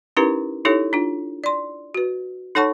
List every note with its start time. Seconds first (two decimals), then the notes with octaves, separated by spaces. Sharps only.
0.17 C#4 D#4 E4 G4 A#4 B4
0.65 D#4 E4 G4 A4 C#5
0.93 D4 F4
1.44 D5 C6
1.94 F#4 B4
2.55 D#4 A4 C#5 F#5 A5 C#6